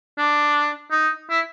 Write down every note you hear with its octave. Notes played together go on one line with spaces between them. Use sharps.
D4
D#4
E4